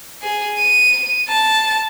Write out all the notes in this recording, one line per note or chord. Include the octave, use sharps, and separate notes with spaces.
G#4
D#7
A5